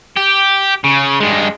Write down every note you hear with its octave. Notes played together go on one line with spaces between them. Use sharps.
G4
C#3
G2 G#3